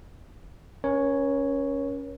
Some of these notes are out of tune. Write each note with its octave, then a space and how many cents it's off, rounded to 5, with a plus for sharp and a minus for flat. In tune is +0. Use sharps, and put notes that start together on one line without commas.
C#4 +0 A#4 +40 C#5 +0